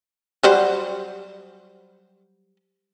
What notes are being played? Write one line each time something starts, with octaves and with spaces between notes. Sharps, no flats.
F#3 G3 C5